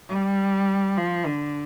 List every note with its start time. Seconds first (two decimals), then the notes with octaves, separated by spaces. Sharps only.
0.09 G3
0.98 F3
1.26 D3